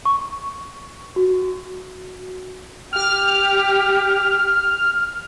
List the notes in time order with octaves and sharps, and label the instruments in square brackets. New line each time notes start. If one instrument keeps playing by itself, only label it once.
[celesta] C#6
F#4
[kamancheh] G4 [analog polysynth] F6